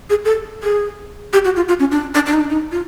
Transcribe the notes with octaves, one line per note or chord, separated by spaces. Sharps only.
G#4
A4
G#4
G4
F#4
F4
F4
C#4
D4
D4
D4
D#4
D4
D#4
F4